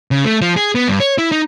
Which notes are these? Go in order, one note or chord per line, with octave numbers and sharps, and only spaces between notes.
C#3
A3
F3
G#4
B3
G2
C#5
E4
D#4